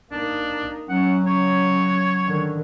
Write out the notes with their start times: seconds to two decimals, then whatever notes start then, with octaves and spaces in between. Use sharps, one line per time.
0.12 A#3 D4 D#4
0.89 F#3 C#4 F#5
1.26 C#3 C#5
2.27 D3 D#3